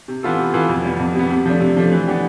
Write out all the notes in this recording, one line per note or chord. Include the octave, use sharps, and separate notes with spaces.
C3
E3 B3 F4 A4
C3
E3 B3 F4 A4
F2
C3 G3 B3
F2
C3 G3 B3
C3
F3 A3 D4
C3
F3 A3 D4
E3
B3 D4 G4